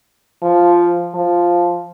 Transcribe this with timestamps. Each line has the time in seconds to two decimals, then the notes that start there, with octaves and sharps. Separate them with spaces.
0.42 F3
1.14 F3